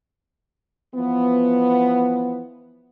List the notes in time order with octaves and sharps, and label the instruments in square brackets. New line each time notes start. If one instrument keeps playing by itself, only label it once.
[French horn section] E3 F3 B3